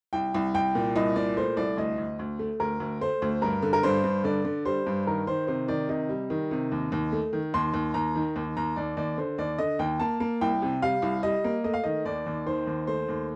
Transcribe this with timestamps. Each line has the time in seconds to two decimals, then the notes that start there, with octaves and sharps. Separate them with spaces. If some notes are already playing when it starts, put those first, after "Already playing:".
0.13 C2 G5
0.34 C2
0.54 C2 G5
0.75 A#2
0.96 C2 D#5
1.16 A#2 D5
1.37 A3 C5
1.57 C2 D5
1.77 D2 D#5
1.98 D2
2.19 D2
2.39 A3
2.60 D2 A#4
2.80 D2
3.01 A3 C5
3.22 D2
3.42 G2 A#4
3.62 D3
3.73 A#4
3.83 G2 C5
4.04 G2
4.24 D3 D5
4.45 D3
4.65 G3 C5
4.86 G2
5.07 D#3 A#4
5.27 D#3 C5
5.47 C3 C5
5.68 D#3 D5
5.89 C3 D#5
6.09 G3
6.30 D#3
6.51 C3
6.72 D#2
6.92 D#2
7.12 A3
7.33 D#3
7.54 D#2 C6
7.74 D#2
7.94 D#2 A#5
8.15 D#3
8.36 D#2
8.57 D#2 A#5
8.76 D#2 D5
8.97 D#2 D5
9.18 D3 C5
9.38 D#2 D5
9.58 D3 D#5
9.79 D#2 G5
10.00 A#3 A5
10.20 A#3
10.41 C2 G5
10.62 C3
10.82 G3 F5
11.02 C2
11.23 G3 D#5
11.44 A#3
11.64 A3 D#5
11.74 F5
11.84 D#3 D#5
12.05 D#2 D5
12.26 D#2
12.46 D#3 C5
12.67 D#2
12.87 A3 C5
13.09 D#2